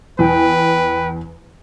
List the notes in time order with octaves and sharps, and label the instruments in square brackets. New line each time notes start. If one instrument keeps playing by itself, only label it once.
[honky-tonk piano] E2 [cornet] B4 [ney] G5